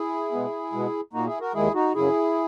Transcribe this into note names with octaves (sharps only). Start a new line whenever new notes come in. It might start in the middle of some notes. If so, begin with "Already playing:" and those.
Already playing: E4 G#4
B2 G#3 B3
B2 G#3 B3
A#2 A#3 D#4 F#4
E4 G#4
F#4 A#4
D#2 D#3 G#3 E4 G#4
D#4 F#4
F#2 C#3 F#3 E4 G#4